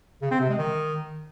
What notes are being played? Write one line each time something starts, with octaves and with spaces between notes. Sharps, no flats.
C#3
C4
C3
G#3
D#3